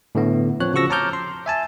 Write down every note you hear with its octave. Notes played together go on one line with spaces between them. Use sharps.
A2 D3 A3 B3
F3 C4 C#5 F#6
C#3 F3 F#4 C#6 E6 A#6
C#5 A5 A#5 D6 F6 G6
C6
E5 G#5 A5